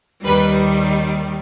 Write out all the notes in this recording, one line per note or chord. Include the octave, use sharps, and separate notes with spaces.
D#2 D#3 G3 B4